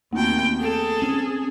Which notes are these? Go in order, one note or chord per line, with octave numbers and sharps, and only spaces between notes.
D#2 A3 B3 C4 G5
G#4 A4
C4 C#4